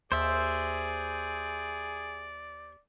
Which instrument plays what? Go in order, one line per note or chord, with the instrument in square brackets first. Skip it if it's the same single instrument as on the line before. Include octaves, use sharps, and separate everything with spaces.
[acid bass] D#2 [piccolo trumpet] G#4 [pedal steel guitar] C5 E5 [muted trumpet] D5